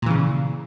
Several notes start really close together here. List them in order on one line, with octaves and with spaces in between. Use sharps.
A#2 E3 C#3